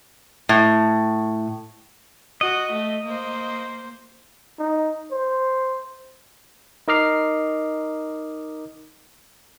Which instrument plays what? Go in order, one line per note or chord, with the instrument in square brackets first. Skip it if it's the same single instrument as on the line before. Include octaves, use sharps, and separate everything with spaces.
[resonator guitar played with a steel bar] A2
[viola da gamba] F#4 [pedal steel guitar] D#5
[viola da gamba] A3
A#3 C5
[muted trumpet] D#4
C5
[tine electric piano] D#4 A#4 D#5 D6 F6 C7